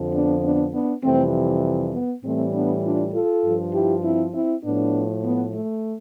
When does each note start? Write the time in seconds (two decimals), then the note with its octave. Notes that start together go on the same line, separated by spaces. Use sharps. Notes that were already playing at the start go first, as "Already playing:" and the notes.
Already playing: F2 D3 F3
0.14 B3 D4
0.43 B3 D4
0.74 B3 D4
1.04 F2 C3 E3 G3 A3 C4
1.94 B3
2.24 A2 E3 G3 A3 C4
2.53 B3 D4
2.84 D4 F4
3.14 F4 A4
3.44 G2 F3
3.73 E4 G4
4.04 C4 E4
4.34 C4 E4
4.64 A2 F3 B3 D4
5.24 B3
5.54 A3